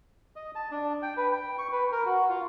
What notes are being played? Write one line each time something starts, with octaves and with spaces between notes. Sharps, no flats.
D#5
A5
D4
G5
B4
G5
C#6
B4
A#4
F#4
F4